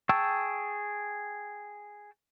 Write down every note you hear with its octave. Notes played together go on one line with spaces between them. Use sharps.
G#4 G5 A5 C#6 E6